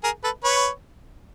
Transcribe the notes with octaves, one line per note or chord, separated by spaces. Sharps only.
G#4 A#4
A4 B4
B4 C#5